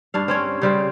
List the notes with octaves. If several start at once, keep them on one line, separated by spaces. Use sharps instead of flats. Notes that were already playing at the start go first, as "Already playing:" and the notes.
G2 D4 F5
C4 C#4 C#5
C#3 G3 C4